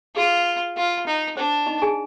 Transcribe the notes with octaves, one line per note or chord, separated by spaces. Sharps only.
F4 G#4
F4
D#4
D4 C5
D#4 D#5
G#4 G#5